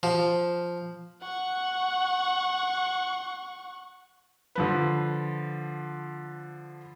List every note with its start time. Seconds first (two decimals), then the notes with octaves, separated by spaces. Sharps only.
0.03 F3
1.22 F#5 C#6
4.55 D3 F3 B4